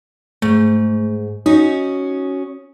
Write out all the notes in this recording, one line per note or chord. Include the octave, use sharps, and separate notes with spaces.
G#2 A3
C#4 D#4 F#4 D#6